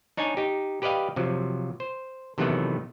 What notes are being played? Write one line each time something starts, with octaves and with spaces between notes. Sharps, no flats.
D4 D#4 C#5 D5 G#5
D#4 G4
G4 B4 D5 D#5 F5 G5
C3 F3 F#3
C5
C3 D#3 E3 F#3 A3 B3